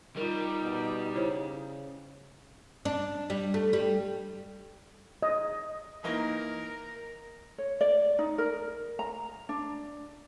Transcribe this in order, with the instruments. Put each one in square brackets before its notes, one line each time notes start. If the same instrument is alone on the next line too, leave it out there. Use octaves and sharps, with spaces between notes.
[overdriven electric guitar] G3 [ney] D#4 [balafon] F4 A#4
[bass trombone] B2
[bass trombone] C#3 [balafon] E4 C5 C#5
[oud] D4
G3
A3
G3
[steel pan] D#5
[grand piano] E3 A#3 D#4 [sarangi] A#4
[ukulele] C#5
D5
D#4
A#4
A#5
D4